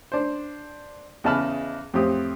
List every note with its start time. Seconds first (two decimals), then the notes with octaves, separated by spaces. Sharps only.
0.12 D4 C5
1.24 E2 C#3 D#5 A5 B5 F6
1.94 F2 A2 C4 G4 D#6